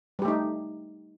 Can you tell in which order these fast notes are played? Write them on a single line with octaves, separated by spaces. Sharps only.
G3 G4 A3 D#4